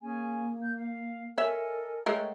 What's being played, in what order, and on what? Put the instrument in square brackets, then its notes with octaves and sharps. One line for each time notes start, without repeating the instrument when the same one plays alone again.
[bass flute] A#3 [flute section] C#4 G#4 G#5
[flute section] G6
F5
[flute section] A4 D#5 G#5 [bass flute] A#4 [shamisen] C#5 E5
[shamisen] G#3 A3 A#4 [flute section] C#5 F#5 G5